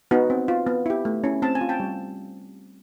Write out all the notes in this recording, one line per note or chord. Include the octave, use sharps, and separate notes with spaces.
B3 D#4 F#4
C4
F4
B3
E4 G4
A3
C#4 E4
C4 A5
G#5
F4
G5 A5
G3